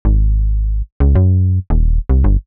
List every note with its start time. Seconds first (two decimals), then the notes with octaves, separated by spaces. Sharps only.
0.05 G#1
1.00 C#2
1.15 F#2
1.70 D#1
2.10 C2
2.24 G1